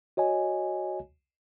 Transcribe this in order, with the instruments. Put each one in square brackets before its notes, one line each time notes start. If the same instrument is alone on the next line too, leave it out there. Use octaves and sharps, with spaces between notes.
[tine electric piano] F#4 C#5 D#5 G#5